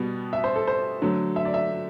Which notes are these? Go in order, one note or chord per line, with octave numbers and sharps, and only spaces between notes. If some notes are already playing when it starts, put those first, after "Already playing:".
Already playing: B2 G3 B3
E5
C5
A4
C5
D3 F#3 A3
E5
D5
E5